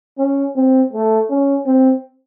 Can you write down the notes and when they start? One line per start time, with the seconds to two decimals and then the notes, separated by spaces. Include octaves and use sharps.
0.18 C#4
0.56 C4
0.93 A3
1.30 C#4
1.66 C4